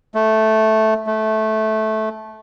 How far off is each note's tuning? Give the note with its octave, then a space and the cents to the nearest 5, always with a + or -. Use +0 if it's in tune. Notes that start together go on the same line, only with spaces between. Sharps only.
A3 -5
A3 -15